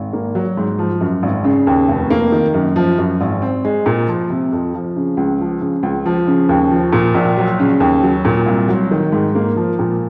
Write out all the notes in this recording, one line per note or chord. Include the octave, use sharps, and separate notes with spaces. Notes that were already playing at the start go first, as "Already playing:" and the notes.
Already playing: G#1
A#3
F#3
G#2
F3
F#2
G#1
C#3
D#2
F1
A#3
D#3
F#2
F3
F#2
G#1
C4
G#3
A#2
F3
C3
F2
F3
C#3
C#2
F3
C#3
C#2
F3
C#3
D#2
F3
A#2
A#1
F#3
C#3
D#2
F#3
A#2
C2
F#3
D#3
G#2
A#3
F3
A#2